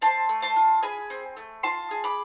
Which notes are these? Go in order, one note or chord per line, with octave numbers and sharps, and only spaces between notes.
C4 A5 C6
A3
A5 C6
F4
G#4 G#5 B5
C4
A3
F4 A5 C6
G#4
B5 D6